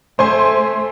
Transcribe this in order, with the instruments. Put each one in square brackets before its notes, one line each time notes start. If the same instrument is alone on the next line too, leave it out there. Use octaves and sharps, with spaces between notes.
[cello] A3 [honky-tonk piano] C5 G#5 C6